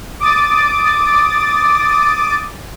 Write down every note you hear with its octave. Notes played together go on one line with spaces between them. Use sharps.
D6 D#6 A6